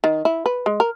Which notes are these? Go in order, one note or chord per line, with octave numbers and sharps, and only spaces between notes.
D#3
E4
B4
G#3
A#4